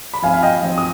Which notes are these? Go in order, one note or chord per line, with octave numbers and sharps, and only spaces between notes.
B5
F3 C4 F5 G#5
F5
D#5 G5
F3 C4
D#6